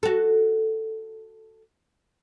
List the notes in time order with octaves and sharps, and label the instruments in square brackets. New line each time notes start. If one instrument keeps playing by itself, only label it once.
[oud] F#4 A4